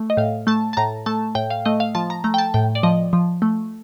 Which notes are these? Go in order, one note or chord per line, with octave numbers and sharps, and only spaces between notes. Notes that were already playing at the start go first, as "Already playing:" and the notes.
Already playing: A3
D#5
A2 F5
A3 A5
A5
A2 A#5
A3 A5
A2 G5
F5
A3 D#5
F5
F3 A5
A#5
A3 A#5
G5
A5
A2 G5
D5
F3 D#5
F3
A3